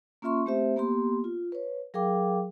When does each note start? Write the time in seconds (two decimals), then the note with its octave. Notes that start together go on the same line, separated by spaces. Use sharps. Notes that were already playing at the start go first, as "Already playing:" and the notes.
0.22 A#3 C#4 F4 E5 C6 C#6
0.46 A3 C4 G4 C5 E5
0.76 A#3 B3 G4 C6
1.24 F4
1.52 B4 C#5
1.94 F#3 G#4 A#4 F5 G5 D6